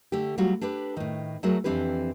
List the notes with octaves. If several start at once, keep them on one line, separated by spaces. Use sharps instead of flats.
D3 A3 G4
F#3 G3 A3 F4 F#4
D4 G4 A4 B4
A2 D#3
F#3 A3 F#4 G#4 A#4
F2 E3 C4 D4 G4 B4